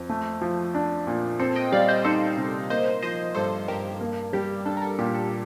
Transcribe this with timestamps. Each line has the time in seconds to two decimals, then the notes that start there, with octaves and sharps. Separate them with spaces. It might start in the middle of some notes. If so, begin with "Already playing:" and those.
Already playing: F2
0.09 A3
0.42 F3
0.75 D4
1.07 A#2
1.40 C4 A4
1.56 D#5 G5
1.72 G3 D5 F5
1.88 C5 D#5
2.04 D#4 A4 C5
2.37 C3
2.70 A#3 C5 D#5
3.03 F3 C5 D#5
3.35 G2 A4 C5
3.68 G2 G4 A#4
4.00 A#3
4.33 G3 G4
4.65 D4 A4
4.77 A#4
4.82 A4
4.98 A#2 G4
5.14 A4